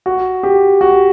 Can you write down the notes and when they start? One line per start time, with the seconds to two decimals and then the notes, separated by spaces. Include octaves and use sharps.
0.06 F#4
0.43 G4
0.81 F#4